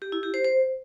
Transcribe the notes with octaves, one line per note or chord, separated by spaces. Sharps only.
G4
E4
G4
C5
C5